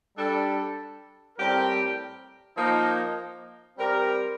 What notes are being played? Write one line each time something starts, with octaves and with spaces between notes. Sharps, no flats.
G3 D4 A4
A2 G3 C4 G4 A#4
F3 A#3 D#4
G3 C4 G4 A#4